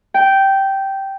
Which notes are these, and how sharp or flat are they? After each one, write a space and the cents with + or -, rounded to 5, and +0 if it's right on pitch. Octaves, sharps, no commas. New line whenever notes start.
G5 -10